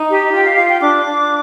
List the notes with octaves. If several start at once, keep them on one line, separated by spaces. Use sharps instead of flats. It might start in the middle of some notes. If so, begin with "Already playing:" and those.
Already playing: D#4
G4
F4 G5
F5
F4 F5
G5
D4 D6
D4